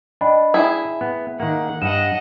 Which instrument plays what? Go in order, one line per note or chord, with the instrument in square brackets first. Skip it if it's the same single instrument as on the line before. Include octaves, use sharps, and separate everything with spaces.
[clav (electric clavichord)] D4 [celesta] D#5 G5 B5
[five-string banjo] E4 G#4 [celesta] E5 G5
[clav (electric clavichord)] B3
[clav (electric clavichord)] D#3 A#3 [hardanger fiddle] F#5
[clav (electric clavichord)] G2 [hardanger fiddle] D#5 F#5 [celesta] E7